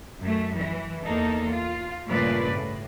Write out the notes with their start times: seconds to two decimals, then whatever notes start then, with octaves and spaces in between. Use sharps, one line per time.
0.20 F#2 A3
0.54 E3
1.03 E2 A#3 D#4 A4
1.50 F4
2.07 G2 A#2 C#3 A3 B4 D5
2.55 A2